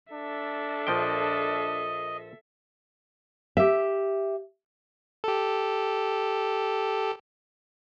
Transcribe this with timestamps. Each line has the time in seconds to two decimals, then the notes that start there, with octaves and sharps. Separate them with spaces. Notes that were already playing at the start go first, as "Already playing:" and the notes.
0.13 D4 A4 E5
0.87 A#1 F3 D#5 G5
3.57 G4 E5
5.24 G4 A4